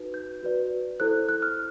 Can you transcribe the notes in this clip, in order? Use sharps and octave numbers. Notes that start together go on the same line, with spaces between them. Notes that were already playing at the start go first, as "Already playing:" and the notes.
Already playing: D#4 F#4 B4
G6
F#4 B4 D5
E4 A4 C5 F#6
F#6
F6